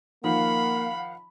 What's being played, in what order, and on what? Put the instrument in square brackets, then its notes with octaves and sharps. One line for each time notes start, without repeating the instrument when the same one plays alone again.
[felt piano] D#3 F3 [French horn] A#3 [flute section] F5 F#5 [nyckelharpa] B5